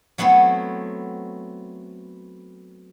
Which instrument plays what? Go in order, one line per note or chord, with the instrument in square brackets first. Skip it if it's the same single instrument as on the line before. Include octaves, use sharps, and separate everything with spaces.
[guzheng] F#3 A3 B3 C4 E4